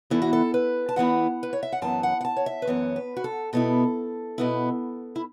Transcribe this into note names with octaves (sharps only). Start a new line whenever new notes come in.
E2 E3 B3 E4 A4
F#4
A4
B4
A5
E2 E3 B3 E4 F#5
B4
C#5
E5
F#5
F#2 E3 B3 A5
F#5
F#5
A5
C#5
E5
B4
F#2 E3 B3 C#5
B4
F#4
A4
B2 B3 E4 A4
B2 B3 E4
E4